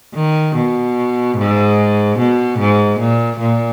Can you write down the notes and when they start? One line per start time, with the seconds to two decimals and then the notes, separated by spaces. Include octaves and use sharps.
0.15 D#3
0.55 B2
1.37 G#2
2.18 B2
2.59 G#2
2.99 A#2
3.40 A#2